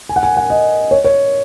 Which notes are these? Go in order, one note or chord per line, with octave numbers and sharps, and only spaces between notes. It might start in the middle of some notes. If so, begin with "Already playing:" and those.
G#5
F#5
G#5
F#5
D#5
C#5
C#5